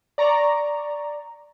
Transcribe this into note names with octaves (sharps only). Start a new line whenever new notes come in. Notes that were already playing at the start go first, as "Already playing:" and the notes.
D5 A#5 C#6